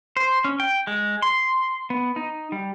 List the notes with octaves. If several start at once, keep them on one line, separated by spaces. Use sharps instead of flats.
C5
C#4
G5
G#3
C6
B3
D#4
G3